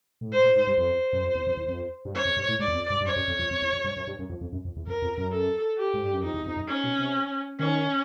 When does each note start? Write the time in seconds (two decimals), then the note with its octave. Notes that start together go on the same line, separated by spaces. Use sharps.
0.21 A2
0.32 G#2 C5
0.44 A2
0.56 G#2
0.67 G2
0.77 F2 C5
1.13 F#2
1.23 F2
1.35 E2
1.47 F2
1.57 E2
1.68 F2
2.05 G2
2.14 F#2 C#5
2.25 F2
2.36 G2
2.48 A2
2.59 G#2 D5
2.68 E2
2.74 F2
2.90 G2
3.01 G2
3.05 F#2 C#5
3.16 F#2
3.27 F2
3.39 F2
3.50 F2
3.62 E2
3.73 F2
3.84 G2
3.96 F#2
4.07 G2
4.19 F#2
4.29 F2
4.41 F2
4.52 F#2
4.65 F2
4.76 E2
4.87 F2 A#4
5.02 F2
5.17 F#2
5.32 A4
5.78 G4
5.94 G#2
6.03 G2
6.13 F#2
6.22 F2 D#4
6.34 E2
6.45 F2
6.56 F#2
6.68 C#4
6.84 B2
6.99 C3
7.59 D#3 C#4